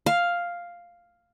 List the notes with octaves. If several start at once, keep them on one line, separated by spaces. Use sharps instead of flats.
F5